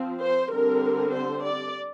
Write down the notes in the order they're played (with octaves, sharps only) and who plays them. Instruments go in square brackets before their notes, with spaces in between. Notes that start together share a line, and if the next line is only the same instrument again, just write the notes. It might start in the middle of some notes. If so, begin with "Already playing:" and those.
Already playing: [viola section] F3 C4
C5
D3 G3 C4 A#4
C5
D5